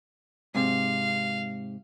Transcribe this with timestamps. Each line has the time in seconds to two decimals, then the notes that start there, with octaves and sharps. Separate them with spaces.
0.55 G#2 C3 F5